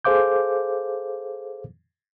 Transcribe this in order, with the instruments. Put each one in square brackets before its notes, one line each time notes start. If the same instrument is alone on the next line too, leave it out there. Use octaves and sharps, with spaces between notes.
[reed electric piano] G#4 A4 C5 F5 D6 G6